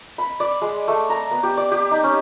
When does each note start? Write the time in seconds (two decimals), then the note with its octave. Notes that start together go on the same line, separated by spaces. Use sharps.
0.18 B5
0.40 D5
0.62 G#3
0.88 A3
1.10 A#5
1.31 B3
1.43 G4
1.57 D5
1.71 G4
1.91 D#4
2.04 C#4